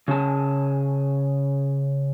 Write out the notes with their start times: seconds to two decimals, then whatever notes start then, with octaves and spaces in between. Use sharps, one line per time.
0.08 C#3 C#4 G#4 A5